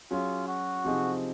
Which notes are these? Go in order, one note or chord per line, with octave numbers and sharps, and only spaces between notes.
F#3 C#4 F4 G#4
F#4
C3 F3 C4 D#4 G#4